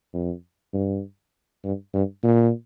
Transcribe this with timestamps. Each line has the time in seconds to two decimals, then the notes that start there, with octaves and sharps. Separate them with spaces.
0.14 F2
0.74 G2
1.64 G2
1.94 G2
2.24 A#2